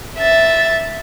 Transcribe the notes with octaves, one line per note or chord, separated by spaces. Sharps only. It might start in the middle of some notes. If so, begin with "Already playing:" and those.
E5 A6